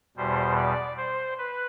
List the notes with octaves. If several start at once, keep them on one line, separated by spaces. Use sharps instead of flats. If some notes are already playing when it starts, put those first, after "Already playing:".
E2 B2 G3 C5
D5
C5
B4